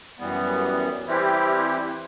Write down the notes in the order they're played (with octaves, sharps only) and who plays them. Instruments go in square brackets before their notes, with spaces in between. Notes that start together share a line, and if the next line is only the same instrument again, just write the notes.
[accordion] F#2 E3 G3 B3
E3 G3 C4 E4 G4